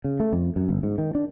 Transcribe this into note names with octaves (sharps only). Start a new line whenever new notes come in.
C#3
A3
F2
F#2
G1
G#2
D#3
D4